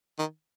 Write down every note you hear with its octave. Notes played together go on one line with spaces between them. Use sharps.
D#3